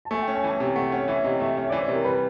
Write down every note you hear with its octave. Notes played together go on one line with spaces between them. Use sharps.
A5
A3 G#5
G5
C#4
G#5
E3 A5
C3
A3 F#5
C#4 F#5
E3 E5
C3 D#5
A3 E5
C#4 E5
E3 D5
C5
C3 A#4
G3 B4